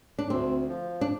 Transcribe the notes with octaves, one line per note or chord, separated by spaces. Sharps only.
D4
D2 C4
F3
D4